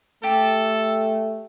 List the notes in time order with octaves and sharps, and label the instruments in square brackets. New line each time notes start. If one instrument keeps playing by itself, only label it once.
[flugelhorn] A3 [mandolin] G4 [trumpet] A4